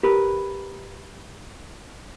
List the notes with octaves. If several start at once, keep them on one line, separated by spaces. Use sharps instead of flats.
G4 A#4 B4